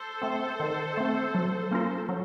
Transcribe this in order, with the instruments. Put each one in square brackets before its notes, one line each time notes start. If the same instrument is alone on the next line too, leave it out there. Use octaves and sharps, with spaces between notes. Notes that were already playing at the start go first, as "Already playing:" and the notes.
Already playing: [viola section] A4 C5
[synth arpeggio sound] A3 C4
D#3
A3 C4
F#3
A#3 C#4 F4 A#4
F#3